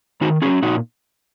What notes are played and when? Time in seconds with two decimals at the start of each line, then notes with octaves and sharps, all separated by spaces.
0.21 D#3 D#4 F#4
0.42 F#3 C#4 F4 G#4
0.62 A#2 D#4 F#4